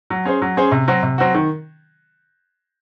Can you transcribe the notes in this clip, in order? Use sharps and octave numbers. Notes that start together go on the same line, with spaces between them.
F#3
C#4 G#4 C5
F#3
C#4 G#4 C5
C3
F#3 C4 F#4
C3
F#3 C4 F#4
D#3